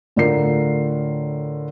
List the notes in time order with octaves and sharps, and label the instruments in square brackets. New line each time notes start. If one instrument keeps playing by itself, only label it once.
[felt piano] A2 D3 F4 A#4 C7